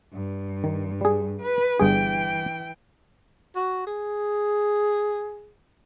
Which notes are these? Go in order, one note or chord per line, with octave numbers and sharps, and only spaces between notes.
G2
D#3
G3 G#4
B4
G1 G2 E3 G#4 G5
F#4
G#4